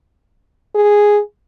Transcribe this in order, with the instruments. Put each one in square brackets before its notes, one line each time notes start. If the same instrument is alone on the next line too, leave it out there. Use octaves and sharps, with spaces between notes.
[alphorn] G#4